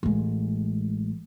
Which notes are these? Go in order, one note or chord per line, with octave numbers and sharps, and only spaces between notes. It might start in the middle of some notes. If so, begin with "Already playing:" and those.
A1 G#3